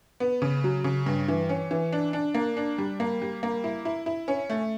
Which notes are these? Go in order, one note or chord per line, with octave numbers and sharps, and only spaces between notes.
B3
C#3
F#3
C#3
G2
E3
C#4
E3
D4
D4
A#3
D4
G3
A#3
G3
A#3
E4
E4
E4
C#4
A3